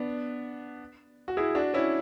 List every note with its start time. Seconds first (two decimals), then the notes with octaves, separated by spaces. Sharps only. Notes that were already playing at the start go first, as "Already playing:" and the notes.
Already playing: B3 D4
1.28 F#4
1.37 E4 G#4
1.55 D4 F#4
1.74 C#4 E4